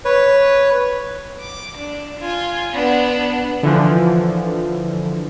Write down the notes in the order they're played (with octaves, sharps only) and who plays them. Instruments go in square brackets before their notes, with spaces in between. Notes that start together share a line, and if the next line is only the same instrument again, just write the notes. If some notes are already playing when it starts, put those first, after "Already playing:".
[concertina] B4 C#5
[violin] D6
D4
F4 G#5
B3 D4
[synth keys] D3 E3 F3